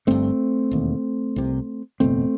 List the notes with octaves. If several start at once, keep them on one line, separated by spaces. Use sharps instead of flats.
G1 G2 A3 C4
E1 D#2
C2 C3
F#1 E2 B2 A3 C4